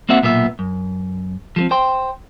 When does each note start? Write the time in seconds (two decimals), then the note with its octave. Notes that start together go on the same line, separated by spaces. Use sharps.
0.09 A#3 C4 F#4 E5 F#5
0.23 B1 A#2 B3 F#4 E5
0.59 F#2
1.56 F3 G#3 C4
1.71 C5 G5 C6